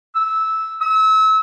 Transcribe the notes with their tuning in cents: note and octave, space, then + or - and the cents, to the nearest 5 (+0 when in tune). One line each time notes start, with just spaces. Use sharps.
E6 -15
E6 -30